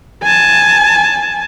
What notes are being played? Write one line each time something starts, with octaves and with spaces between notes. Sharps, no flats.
G#5 A5